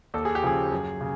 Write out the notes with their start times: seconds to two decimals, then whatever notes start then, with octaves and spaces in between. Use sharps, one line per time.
0.14 D#2 A4
0.25 G#4
0.35 G4
0.43 C#3 F3 G#4
0.72 F#2
1.01 C#3